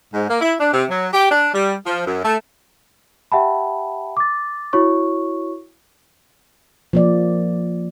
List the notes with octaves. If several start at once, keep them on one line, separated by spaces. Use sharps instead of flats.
G#2
A#3
E4
D4
C3
F#3
G4
D4
G3
F3
F#2
A3
G4 E5 F#5 G5 A5 B5
D6 A6
E4 F#4 C#5 C#6
F3 A#3 D5